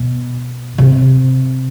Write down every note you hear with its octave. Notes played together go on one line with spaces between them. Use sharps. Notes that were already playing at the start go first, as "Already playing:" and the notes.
Already playing: B2
C3